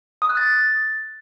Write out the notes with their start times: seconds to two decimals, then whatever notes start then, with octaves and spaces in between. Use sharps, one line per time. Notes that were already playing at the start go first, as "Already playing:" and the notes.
0.22 D#6
0.29 F#6
0.37 A6